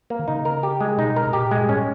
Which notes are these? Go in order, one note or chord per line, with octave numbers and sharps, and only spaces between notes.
A#3
D#3
C#3 D#4
A#4
G4
G#3
B2 D#4
A#4
B2
A#2 G4
G#3
G2
G#2 C#4